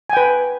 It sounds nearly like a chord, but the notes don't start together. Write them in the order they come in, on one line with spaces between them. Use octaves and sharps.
G#5 G5 B4